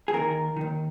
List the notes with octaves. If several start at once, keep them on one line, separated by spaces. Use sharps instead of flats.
G#4
D#2 D#3 A#4
D#2 D#3